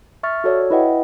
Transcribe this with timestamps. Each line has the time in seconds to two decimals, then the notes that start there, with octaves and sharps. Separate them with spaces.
0.23 E5 C#6 F6 A6
0.44 F#4 A4 C#5 D5
0.70 E4 B4 D#5 E5 F#5 G5